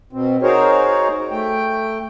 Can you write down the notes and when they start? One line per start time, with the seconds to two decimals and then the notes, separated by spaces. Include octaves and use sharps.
0.13 B2 C4
0.42 D#4 F#4 G#4 A#4 C5 C#5
1.31 A3 G5